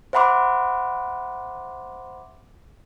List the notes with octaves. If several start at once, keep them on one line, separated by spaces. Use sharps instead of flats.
C5 E5 F#5 B5 C6 D6